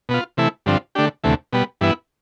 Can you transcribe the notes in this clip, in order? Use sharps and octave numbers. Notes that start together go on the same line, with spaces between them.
B2 B3 F4
C3 E3 A3 E4
G2 D3 F3 C4
D3 A3 D4 G4
D2 C3 E3 A3
B2 G3 B3
G2 E3 B3 E4